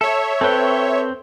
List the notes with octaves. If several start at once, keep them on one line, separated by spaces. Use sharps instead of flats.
A4 C#5 E5
C4 A4 B4 C5 G5